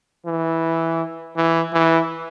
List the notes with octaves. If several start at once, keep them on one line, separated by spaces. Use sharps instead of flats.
E3
E3
E3